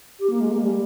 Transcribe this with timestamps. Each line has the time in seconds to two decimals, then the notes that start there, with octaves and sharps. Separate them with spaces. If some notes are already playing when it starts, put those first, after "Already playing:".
0.19 G4
0.30 A#3
0.40 G#3
0.52 A#3
0.62 G3